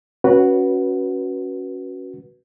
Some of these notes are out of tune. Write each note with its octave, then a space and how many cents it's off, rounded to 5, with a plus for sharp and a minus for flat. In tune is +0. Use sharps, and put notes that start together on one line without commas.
C#4 +0 F#4 +0 B4 -20